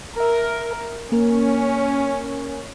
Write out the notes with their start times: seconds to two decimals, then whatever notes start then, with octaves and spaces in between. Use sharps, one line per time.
0.20 A#4 E5
1.12 A#3 C#4 A#4